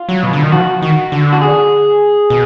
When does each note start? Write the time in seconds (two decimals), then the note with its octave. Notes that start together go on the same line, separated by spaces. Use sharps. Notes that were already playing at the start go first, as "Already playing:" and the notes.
Already playing: F4
0.09 F#3
0.23 B2
0.33 D3
0.43 D#3
0.52 F3 F#4
0.82 D#3
1.12 D3
1.33 F#4
1.41 G#4
2.30 B2